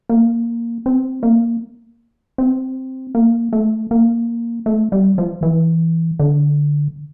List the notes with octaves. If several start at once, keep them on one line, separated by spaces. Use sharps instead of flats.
A#3
C4
A#3
C4
A#3
A3
A#3
A3
G3
F3
E3
D3